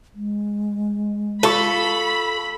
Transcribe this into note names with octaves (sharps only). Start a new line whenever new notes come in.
G#3
F4 A4 B5 C#6